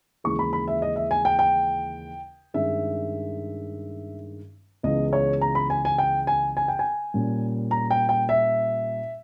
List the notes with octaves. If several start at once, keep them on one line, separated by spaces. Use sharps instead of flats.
D#2 C#3 E3 G#3 C#6
B5
B5
E5
D#5
E5
G#5
G5
G5
G2 D#3 G#3 C#4 E5
C#2 C#3 E3 G#3 B3 D#5
C#5
A#5
B5
G#5
G#5
G5
G#5
G#5
G5
G#5
A#2 G3 C#4
A#5
G5
G5
E5